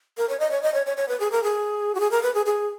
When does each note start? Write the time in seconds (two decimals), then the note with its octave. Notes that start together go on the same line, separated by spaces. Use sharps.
0.18 A#4
0.29 C#5
0.40 D#5
0.51 C#5
0.63 D#5
0.74 C#5
0.86 C#5
0.97 C#5
1.08 B4
1.20 G#4
1.32 A#4
1.44 G#4
1.95 F#4
2.00 G#4
2.11 A#4
2.23 B4
2.35 G#4
2.46 G#4